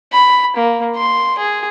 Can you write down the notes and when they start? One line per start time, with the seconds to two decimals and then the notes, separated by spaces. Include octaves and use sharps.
0.12 B5
0.56 A#3
0.96 C6
1.38 G#4